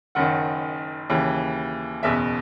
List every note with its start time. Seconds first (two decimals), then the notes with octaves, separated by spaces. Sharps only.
0.15 F#1 F#2 D#3 F#5
1.10 D#2 C#3 E3
2.03 F#1 E2 B2 E5